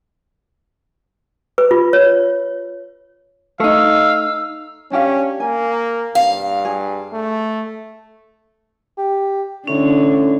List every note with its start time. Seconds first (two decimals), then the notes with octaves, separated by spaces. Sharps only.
1.58 B4
1.71 F4
1.93 C#5
3.60 A3 D#4 F5 E6
4.92 C#4 D4 G4 F5
5.40 A#3 G#5
6.15 G2 F5
6.65 G#4
7.12 A3
8.97 G4
9.67 A2 D3 C#4